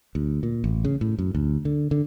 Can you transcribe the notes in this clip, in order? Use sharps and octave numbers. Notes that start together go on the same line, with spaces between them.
D2
A#2
A1
C#3
A2
F#2
D2
D3
D3